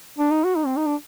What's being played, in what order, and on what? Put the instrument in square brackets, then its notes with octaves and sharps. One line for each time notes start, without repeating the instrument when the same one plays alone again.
[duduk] D4
D#4
F#4
D#4
C4
D#4
D4